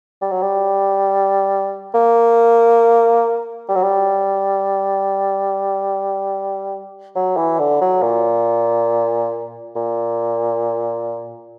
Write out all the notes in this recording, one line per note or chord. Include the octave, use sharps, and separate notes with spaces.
G3
F#3
G3
A#3
G3
F#3
G3
F#3
E3
D3
F#3
A#2
A#2